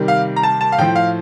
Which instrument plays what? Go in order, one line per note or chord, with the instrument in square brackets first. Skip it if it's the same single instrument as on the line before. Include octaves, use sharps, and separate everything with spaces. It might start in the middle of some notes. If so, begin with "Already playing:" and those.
Already playing: [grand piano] C3 D#3 G3
F5
A#5
A5
A5
F5
A2 F3 G5
F5